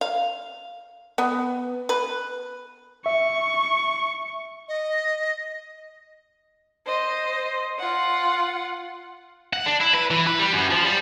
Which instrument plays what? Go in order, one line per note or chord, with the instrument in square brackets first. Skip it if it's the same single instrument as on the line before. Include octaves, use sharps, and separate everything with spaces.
[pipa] F5
B3
B4
[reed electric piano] E5 [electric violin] C#6
[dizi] D#5
[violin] C5 D#5
F4 F#5
[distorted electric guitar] F#5
D4
E4
B4
E3
B4
G3
F#2
F3
G3